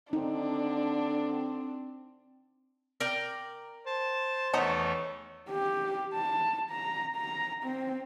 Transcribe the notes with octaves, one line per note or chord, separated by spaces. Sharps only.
D3 C4 D4 D#4
A#4 D5 G5
C5 A5
E2 D#3 A3 B3 D#4 C#5
G4
A5
A#5
A#5
C4